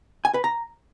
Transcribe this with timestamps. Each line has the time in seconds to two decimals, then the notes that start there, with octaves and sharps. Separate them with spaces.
0.25 G#5
0.34 B4
0.44 A#5